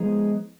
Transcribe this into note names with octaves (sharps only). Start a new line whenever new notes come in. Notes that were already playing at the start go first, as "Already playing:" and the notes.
Already playing: F3 G#3 B3 D#4 G#4